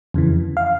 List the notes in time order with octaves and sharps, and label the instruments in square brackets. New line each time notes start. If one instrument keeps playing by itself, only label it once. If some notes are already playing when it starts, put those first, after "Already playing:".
[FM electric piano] F2 C#3 E3
F5